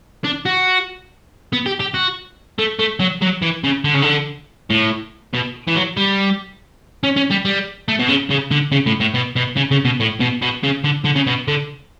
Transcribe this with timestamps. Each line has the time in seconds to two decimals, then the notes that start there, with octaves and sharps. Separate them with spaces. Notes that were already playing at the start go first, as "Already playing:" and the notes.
0.24 D4
0.45 F#4
1.53 B3
1.66 G4
1.80 G4
1.94 F#4
2.59 A3
2.79 A3
3.00 F#3
3.22 F#3
3.42 E3
3.64 C#3
3.84 D3
3.94 C#3
4.02 D3
4.70 A2
5.34 B2
5.68 E3
5.75 F#3
5.97 G3
7.03 C#4
7.16 C#4
7.31 G3
7.45 G3
7.88 A3
7.99 B2
8.08 C#3
8.30 C#3
8.51 D3
8.72 C#3
8.86 A2
9.00 A2
9.14 B2
9.36 B2
9.57 C#3
9.71 C#3
9.85 B2
10.00 A2
10.20 B2
10.42 B2
10.63 C#3
10.84 D3
11.05 D3
11.16 C#3
11.27 B2
11.48 D3